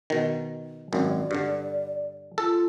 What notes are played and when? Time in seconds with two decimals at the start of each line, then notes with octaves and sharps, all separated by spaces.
0.10 B2 D#3
0.93 G#1 F#2 D5
1.31 G2 D3
2.38 F4 A4